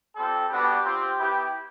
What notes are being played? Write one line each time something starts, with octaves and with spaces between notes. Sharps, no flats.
G3 C4 F4 A4
G3 B3 D4 F#4 G4
C4 F4
B3 E4 G4